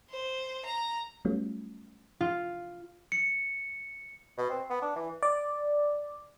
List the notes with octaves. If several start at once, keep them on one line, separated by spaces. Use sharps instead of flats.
C5
A#5
F#3 G3 A3 B3 C#4 F4
F4
C#7
B2
C4
B3
D4
E3
D5